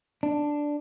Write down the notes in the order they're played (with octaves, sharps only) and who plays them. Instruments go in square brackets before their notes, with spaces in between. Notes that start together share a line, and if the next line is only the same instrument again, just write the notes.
[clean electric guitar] D4